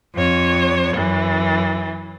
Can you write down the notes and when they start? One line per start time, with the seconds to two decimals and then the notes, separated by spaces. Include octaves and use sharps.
0.15 F2 C#5
0.94 F#2 E3